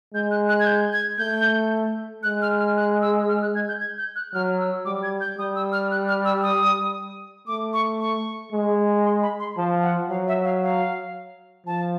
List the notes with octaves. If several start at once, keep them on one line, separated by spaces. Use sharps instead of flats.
G#3 G6
F#6
F#6
G#6
G6
G#6
A3 G6
G#3 F#6
F6
F6
F#6
E6
F6
F#6
G#6
G6
G#6
G6
F#6
F#3 F6
E6
G3 D6
G#6
G6
G3 D#6
E6
F6
F#6
F6
E6
D#6
A3 D6
C#6
C#6
G#3
C6
B5
C6
F3 A5
F#5
F#3 F5
E5
F5
F5
F3 A5